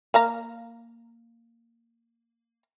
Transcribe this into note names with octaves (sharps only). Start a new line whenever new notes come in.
A#3 F5 A#5